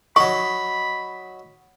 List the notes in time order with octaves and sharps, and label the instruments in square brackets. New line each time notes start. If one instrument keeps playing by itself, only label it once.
[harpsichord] F#3 D#4 [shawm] B5 [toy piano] C#6